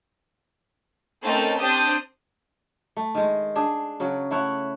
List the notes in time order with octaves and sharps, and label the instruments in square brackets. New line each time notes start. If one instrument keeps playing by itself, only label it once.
[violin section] A3 C4 C#4 D#4 A4 A#4
C4 D4 G4 A5 D#6 G6
[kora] A3
D#3 G#3
D4 G#4
C#3 F#3
A3 E4 C#5 F#5